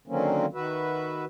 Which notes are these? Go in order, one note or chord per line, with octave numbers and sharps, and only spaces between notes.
D3 D#3 F#3 A#3 C4 C#4
D#3 F#4 B4 E5